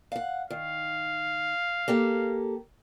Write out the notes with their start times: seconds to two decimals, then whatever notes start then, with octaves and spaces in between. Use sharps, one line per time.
0.12 F5 F#5
0.50 D#3 F5
1.88 A#3 G4 A4